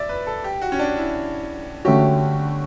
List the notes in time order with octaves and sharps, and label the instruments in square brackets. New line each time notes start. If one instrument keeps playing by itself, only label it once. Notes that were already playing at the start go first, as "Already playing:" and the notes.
Already playing: [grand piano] D5 E5
B4
A4
G4
F#4
C#4
D4
E4
[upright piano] D3 A3 C#4 F#4 [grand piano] G4